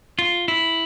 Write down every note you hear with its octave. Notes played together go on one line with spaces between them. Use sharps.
F4
E4